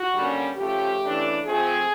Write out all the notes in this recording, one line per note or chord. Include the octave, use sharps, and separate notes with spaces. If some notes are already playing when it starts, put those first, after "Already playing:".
Already playing: F#4
D3 G3 A#3 C#4
C#3 F3 A3 G4
C#3 E3 A3 D4
F3 A3 C4 G#4